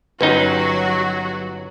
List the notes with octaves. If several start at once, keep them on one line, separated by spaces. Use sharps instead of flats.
G1 F#3 C#4 D#4 F#4 B4